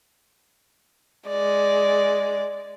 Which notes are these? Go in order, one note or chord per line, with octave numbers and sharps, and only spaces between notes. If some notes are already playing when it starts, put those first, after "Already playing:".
G#3 D5